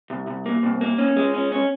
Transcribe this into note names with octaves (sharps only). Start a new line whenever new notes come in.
C2
C2
A#3
C2
A#3
C#4
G#3
C#4
C#4